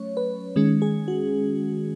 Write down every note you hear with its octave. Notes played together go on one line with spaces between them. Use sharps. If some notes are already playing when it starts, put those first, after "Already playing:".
Already playing: F#3 A3 C#4 C#5
B4
D#3 G#3 C#4
G#4
F#4